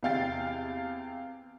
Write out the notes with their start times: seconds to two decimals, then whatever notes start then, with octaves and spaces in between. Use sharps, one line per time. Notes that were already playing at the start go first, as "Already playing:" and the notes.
0.03 E2 C3 F5 G5 A6 C7